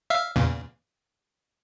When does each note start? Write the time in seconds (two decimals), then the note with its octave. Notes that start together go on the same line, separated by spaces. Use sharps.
0.10 E5 F5
0.36 E2 A#2 C#3